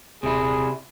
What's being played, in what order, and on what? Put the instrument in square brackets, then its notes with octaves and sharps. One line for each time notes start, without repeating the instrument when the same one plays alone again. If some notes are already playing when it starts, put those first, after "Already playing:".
[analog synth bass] D#1 [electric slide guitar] C3 E4 [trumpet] G#4